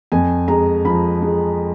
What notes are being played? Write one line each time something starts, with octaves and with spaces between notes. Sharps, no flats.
F2 G#5
G#3 A#5
F3 B5
G#3